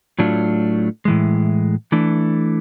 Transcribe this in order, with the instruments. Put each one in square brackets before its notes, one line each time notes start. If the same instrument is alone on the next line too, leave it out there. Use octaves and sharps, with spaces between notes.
[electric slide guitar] A2 F#3 A3 D4 F4
A2 E3 G#3
E3 A3 D4